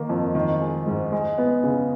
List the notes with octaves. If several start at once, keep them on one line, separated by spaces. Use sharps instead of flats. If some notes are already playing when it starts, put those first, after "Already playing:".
Already playing: D#3 A#3
F2
D#3
G#3
G#2
G#3
B3
C#3